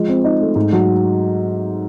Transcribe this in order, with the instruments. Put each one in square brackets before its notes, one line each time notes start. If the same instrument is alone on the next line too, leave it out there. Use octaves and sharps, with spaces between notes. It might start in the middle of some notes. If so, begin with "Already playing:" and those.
Already playing: [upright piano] F3 G#3
C4
D#4
A3
G#2
F#3